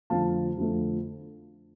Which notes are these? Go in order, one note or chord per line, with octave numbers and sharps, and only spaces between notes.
F2 D3 F3 A3 F5 A5
F2 D3 F3 A3